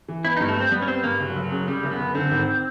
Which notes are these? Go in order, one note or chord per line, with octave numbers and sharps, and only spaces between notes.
E3
B3 E4
G2 D#4
A3
G2 C4
G3 B3
C#4
B3 C4
G2 A#3
F#1 F#3
F#1
F#3
C#3
C#3 G3
F#1
B3
F#1
D3 C4
G#1